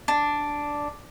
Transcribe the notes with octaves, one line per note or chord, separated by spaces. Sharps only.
D4